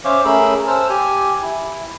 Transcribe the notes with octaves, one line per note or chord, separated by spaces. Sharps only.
C#4 C5 C#5 E5 F5 D6
A3 C#4 G#4 A#4 B5 E6
C5 A5 E6 F6
G4 G#5
E4